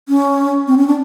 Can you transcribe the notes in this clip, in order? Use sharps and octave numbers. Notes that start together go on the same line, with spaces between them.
C#4
C4
C#4
D4